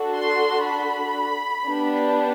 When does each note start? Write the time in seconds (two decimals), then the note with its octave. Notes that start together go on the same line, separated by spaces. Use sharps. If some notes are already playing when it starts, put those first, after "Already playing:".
Already playing: D4 F#4 A4
0.15 C6
0.65 B5
1.66 B3 D4 G4